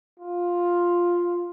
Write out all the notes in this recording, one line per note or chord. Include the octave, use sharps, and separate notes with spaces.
F4